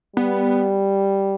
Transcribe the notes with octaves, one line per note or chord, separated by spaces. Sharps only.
G3 B3